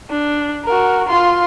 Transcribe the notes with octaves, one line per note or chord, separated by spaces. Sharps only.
D4
F#4 A#4
F4 C6